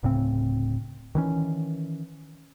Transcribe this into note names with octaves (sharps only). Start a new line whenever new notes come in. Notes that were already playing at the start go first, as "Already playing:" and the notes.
D1 A2 C#3 C4
D#3 E3 C#4